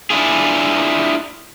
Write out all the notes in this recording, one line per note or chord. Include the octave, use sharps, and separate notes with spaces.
D4 E4 F4 G#4